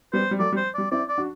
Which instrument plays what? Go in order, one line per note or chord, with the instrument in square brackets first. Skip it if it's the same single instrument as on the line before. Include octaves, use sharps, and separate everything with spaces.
[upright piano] G3 B3 [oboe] C5
[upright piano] G3
[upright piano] F#3 A3 [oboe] D5
[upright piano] G3
[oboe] C5
[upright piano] G3 [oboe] D5
[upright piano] C4 E4 [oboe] D5
[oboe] D5
[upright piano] D4 F#4